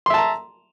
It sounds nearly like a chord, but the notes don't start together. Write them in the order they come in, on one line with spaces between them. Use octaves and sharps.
C6 E5 A5 A#5